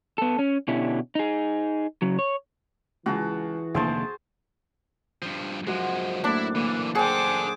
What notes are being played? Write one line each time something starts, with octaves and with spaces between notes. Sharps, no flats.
B3 A4
C#4
B2 D3 C#4 E4 G4
D#4 G#4
C#3 F#3
C#5
C#2 E3 F#4 G#4 A5
F1 D2 D#3 A#3 G#4 C5 A5
G2 F3
F#2 F3 G#3 F#4 C5
A2 A#3 D4 E4
A#2 D3 E3
G#4 A4 C5 F#5 G5 D6